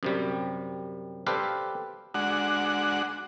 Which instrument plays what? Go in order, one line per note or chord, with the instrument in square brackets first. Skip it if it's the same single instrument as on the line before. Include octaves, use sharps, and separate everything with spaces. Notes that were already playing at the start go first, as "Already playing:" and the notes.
[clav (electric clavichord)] F#2 C3 G3
G4 A4 B4 C5 D5 F5
[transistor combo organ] G#3 D4 F#4 F#5